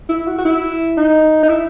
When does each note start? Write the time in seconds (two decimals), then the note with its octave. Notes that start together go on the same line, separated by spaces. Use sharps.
0.09 E4
0.27 F#4
0.38 F#4
0.45 E4
0.97 D#4
1.43 D#4
1.49 E4